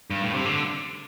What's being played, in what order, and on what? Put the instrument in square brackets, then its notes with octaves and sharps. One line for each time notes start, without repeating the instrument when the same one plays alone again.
[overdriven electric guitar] G2
A2
C3
D3